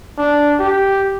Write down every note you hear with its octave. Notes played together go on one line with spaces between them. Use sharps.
D4
G4